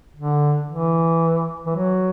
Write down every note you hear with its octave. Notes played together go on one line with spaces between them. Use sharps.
D3
E3
E3
F#3